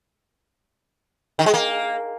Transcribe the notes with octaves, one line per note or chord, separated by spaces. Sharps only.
D#3
G#3
A#3